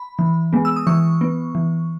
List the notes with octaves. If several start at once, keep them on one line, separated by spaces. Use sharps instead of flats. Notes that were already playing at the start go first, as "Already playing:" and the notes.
Already playing: B5
E3
G#3 B3
E6
D#6
E3 C#6
B3
E3